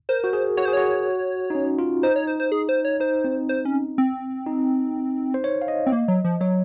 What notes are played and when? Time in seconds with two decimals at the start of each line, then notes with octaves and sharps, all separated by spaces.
0.09 A#4 C5
0.24 F#4
0.33 G#4
0.57 F#4 C#5
0.65 G#4 C5
0.73 F#4 C#5
1.50 D#4
1.55 C#4
1.79 F4
2.03 D#4 C5
2.16 C#5
2.27 C5
2.40 C5
2.52 G#4
2.69 C5
2.85 C#5
3.00 D#4 C5
3.24 C4
3.49 C5
3.65 C#4
3.98 C4
4.46 D#4
5.34 C5
5.44 C#5
5.62 F5
5.68 D#5
5.86 C4
5.92 A#3
6.08 F#3
6.24 F3
6.41 F#3 C#5